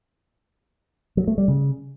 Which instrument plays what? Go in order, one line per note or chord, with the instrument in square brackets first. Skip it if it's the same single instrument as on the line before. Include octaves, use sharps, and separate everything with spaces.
[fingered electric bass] F#3
A3
G3
C#3